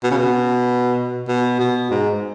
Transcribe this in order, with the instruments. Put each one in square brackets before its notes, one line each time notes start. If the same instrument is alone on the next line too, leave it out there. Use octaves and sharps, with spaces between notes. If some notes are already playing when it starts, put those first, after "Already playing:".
[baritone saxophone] B2
C#3
B2
B2
B2
G#2